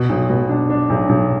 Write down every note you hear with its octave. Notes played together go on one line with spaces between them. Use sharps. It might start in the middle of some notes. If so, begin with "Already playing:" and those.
Already playing: B2
B1
B2
D4
D4
B1
B1